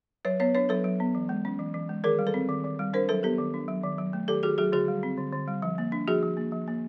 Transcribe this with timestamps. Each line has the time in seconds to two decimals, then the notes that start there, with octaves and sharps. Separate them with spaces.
0.25 F#3 B4 C#5
0.40 B3 B4 C#5
0.54 D4 B4 C#5
0.69 F#3 A4 B4
0.84 F#3
1.00 B3
1.15 E3
1.29 G#3
1.45 C#4
1.59 E3
1.74 E3
1.89 G#3
2.04 D#3 G#4 A#4
2.19 G3
2.27 A4 B4
2.34 C4
2.49 D#3
2.64 D#3
2.79 G3
2.93 D4 A#4 C5
3.09 F#3 A4 B4
3.23 B3 G4 A4
3.38 D#3
3.54 D4
3.68 F#3
3.83 D#3
3.98 F#3
4.13 A3
4.28 D#3 G4 A4
4.43 D#3 F#4 G#4
4.58 F#3 F#4 G#4
4.72 D3 F#4 G#4
4.88 G3
5.03 C4
5.17 D3
5.32 D3
5.48 G3
5.62 F3
5.78 A#3
5.92 D4
6.08 F3 F#4 G#4
6.23 F3
6.37 A#3
6.52 F3
6.68 A#3